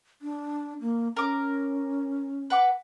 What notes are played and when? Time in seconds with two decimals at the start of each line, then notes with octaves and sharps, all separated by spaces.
0.22 D4
0.81 A#3
1.17 C#4 A#4 D6
2.50 B4 F#5 D6